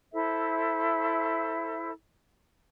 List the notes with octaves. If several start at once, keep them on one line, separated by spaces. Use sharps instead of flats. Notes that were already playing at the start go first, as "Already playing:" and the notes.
E4 A4 C5 E5